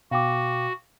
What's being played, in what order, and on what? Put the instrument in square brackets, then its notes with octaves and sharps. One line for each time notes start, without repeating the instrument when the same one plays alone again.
[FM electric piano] B2 [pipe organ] F#4 [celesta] F5 G5 D6